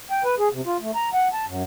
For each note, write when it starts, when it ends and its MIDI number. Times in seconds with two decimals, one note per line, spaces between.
0.11 0.23 79
0.24 0.35 71
0.39 0.48 68
0.53 0.61 48
0.66 0.77 65
0.81 0.91 57
0.95 1.09 82
1.13 1.28 78
1.33 1.45 81
1.48 1.63 42